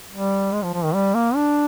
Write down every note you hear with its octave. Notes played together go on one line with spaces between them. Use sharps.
G3
G#3
F3
F3
D#3
G3
A#3
D4